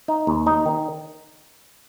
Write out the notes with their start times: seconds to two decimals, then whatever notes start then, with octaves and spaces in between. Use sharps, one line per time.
0.08 D#4
0.27 D#2
0.47 D#4
0.66 D#3